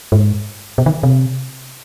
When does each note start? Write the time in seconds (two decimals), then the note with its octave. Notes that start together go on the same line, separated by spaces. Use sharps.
0.12 G#2
0.78 B2
0.86 D#3
1.03 C3